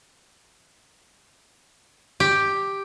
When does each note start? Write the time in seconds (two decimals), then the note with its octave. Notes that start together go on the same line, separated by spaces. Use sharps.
2.20 G4